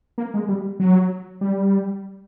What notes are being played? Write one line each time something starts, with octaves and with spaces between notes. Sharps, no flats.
A#3
G#3
G3
F#3
G3